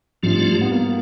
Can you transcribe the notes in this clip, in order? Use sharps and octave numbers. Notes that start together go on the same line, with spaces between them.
G#2 F3 G3 A3 D4 F4
G3
B3
A#3